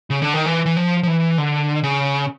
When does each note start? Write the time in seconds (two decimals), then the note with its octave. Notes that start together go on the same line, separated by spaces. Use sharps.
0.10 C#3
0.22 D3
0.34 D#3
0.46 E3
0.66 E3
0.77 F3
1.03 F3
1.07 E3
1.38 D3
1.83 C#3